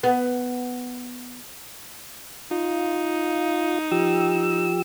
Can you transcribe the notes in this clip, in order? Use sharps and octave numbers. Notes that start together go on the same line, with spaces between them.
B3
D#4 F4
F3 G4 E6